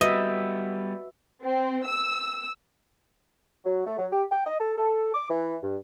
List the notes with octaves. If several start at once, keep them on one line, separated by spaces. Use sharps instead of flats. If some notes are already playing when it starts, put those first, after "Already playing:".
G3 B3 F#4 B4 D#5 E5
C4
E6
F#3
A3
F#3
G4
G5
D#5
A4
A4
D6
E3
G2